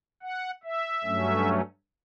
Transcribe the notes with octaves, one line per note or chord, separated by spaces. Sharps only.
F#5
E5
G2 F#3 A3 C#4